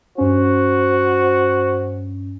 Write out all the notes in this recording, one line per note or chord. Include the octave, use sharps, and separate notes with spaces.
G2 C#4 F#4 C5